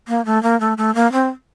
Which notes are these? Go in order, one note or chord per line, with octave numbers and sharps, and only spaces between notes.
A#3
A3
A#3
A3
A3
A#3
C4